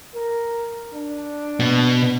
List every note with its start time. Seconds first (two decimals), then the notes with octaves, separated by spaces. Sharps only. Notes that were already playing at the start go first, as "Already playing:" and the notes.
0.15 A#4
0.94 D4
1.60 B2